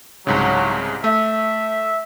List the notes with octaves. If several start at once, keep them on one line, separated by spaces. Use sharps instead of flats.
C2 G#2 C#3 F#3
A3 E5